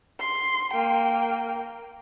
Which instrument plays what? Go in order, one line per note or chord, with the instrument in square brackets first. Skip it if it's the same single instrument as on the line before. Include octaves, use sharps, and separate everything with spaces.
[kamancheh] C6
A#3 G5